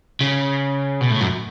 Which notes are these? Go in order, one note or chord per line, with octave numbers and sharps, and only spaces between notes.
C#3
B2
A2
F#2